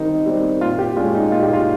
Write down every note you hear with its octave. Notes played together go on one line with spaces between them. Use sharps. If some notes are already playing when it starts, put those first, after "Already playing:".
Already playing: D#3 G3 C4 D#4
G3 C4
A#2 F4
G4
G#3 C#4 F4
D#4
A#2 F4
G4
F4